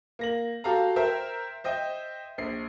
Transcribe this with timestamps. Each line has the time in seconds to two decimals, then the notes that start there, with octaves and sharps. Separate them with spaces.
0.19 A#3 A#6 F#7
0.64 F#4 G4 A4 F5 A#5
0.96 A#4 C5 E5 G5
1.64 C5 D#5 E5 G5
2.38 A#1 C7